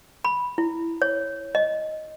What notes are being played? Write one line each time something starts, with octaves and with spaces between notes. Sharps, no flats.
B5
E4
C#5
D#5